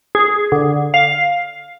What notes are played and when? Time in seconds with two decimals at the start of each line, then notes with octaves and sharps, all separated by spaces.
0.15 G#4
0.52 D3
0.94 F5